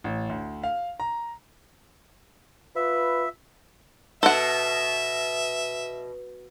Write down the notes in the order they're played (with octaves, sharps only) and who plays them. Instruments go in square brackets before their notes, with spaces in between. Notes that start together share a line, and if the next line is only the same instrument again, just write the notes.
[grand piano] A1
D2
F5
A#5
[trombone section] F4 B4 [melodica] E5
[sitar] B2 [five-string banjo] A4 F#5 [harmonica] E5